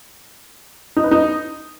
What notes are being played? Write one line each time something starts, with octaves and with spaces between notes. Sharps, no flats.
D#4
B4
D#4